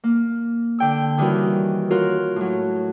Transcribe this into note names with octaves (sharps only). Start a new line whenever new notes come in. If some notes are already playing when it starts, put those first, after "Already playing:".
A#3
D3 G5 E6
D#3 E3 G3 C#4 F#4 A#4
F4 F#4 A#4 C#5
A2 F#3